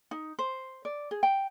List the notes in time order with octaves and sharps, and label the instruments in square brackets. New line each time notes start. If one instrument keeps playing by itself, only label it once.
[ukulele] D#4
C5
D5
G#4
G5